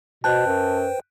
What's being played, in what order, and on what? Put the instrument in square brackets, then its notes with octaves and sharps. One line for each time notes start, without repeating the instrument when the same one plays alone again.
[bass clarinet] B2 [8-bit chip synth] B4 C5 G5 [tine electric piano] A5 [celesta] F#6 G6
[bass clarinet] F#2